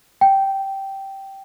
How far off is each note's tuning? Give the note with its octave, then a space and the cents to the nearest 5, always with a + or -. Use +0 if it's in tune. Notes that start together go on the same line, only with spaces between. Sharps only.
G5 -10